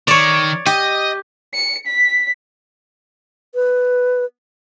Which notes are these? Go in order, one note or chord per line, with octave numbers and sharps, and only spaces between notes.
D#3 C#5 D5
G4 D#5
C#7
B6
B4